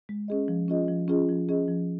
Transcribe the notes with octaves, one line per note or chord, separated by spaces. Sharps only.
G#3
C#4 G#4 D#5
F3
C#4 F4 G#4 D#5
F3
C#4 F4 G#4 D#5
F3
C#4 G#4 D#5
F3